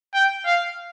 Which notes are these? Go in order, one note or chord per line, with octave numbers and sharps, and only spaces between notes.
G5
F5